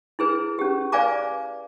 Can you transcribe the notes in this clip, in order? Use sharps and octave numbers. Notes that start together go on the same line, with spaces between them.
E4 G#4 B4
C#4 G4
B4 D5 F5 G#5 A#5 D6